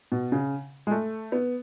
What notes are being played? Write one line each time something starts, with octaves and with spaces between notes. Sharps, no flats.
B2
C#3
G#3
A3
B3